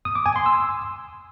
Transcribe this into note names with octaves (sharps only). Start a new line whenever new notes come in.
D#6
D6
G#5
C6
E6